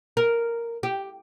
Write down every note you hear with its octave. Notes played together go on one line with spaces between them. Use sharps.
A#4
G4